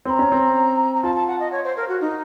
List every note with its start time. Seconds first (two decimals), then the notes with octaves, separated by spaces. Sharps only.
0.05 C4 C6
0.10 A#5
0.19 C#4
0.32 C4
0.95 A#5
1.03 F4 A5
1.15 A5
1.28 F#5
1.40 D#5
1.52 C#5
1.64 C5
1.77 A#4
1.89 F#4
2.01 D#4